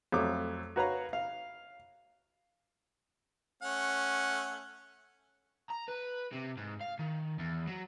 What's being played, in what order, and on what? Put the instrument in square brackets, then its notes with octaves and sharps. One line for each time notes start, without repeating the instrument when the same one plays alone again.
[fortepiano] F2 F#3 A3 D6
F#4 A#4 B4 C#5 F5 A#5
F5
[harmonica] A3 C#4 F#5
[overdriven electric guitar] A#5
B4
C3
G#2
F5
D#3
E2
F#3